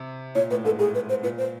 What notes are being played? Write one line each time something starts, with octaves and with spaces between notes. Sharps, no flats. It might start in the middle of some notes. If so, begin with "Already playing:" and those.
Already playing: C3
A#2 C#5
A2 B4
G#2 A4
A2 G#4
B4
C5
A#2 B4
C5